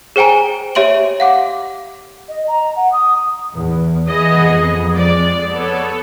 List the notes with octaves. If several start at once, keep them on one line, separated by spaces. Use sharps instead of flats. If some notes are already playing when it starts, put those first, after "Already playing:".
G#4 C5 G5 G#5 A#5
G4 C#5 E5 C6 D7 F#7
F5 F#5 D6
D#5
A#5
F#5
D#6
E2
E3 B3 G#4 D#5
F2
G#3 D5
B3 A4 C#5